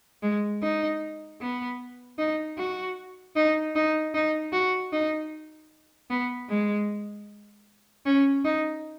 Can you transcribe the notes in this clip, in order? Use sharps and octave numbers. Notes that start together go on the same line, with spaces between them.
G#3
D#4
B3
D#4
F#4
D#4
D#4
D#4
F#4
D#4
B3
G#3
C#4
D#4